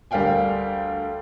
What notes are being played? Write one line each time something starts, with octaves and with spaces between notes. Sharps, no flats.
D2 G3 A#4 F5 G5 G#5